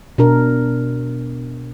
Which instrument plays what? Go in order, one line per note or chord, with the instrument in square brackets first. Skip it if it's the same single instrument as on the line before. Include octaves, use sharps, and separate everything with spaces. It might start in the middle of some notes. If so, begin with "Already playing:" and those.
[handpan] B2 D4 A#4